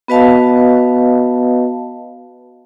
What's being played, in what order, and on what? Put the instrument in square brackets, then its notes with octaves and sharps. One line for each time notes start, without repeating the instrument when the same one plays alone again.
[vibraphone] B3 F#4 B4 D#5 F5 A5